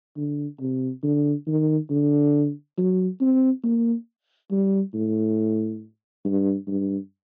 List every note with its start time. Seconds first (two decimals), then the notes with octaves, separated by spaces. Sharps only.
0.16 D3
0.60 C3
1.03 D3
1.47 D#3
1.90 D3
2.78 F#3
3.20 C4
3.63 A#3
4.51 G3
4.94 A2
6.25 G2
6.67 G2